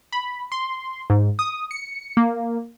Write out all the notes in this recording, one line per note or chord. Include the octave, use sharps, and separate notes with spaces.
B5
C6
G#2
D#6
C#7
A#3